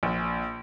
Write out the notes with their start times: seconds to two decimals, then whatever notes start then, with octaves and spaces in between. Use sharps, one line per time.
0.03 A#1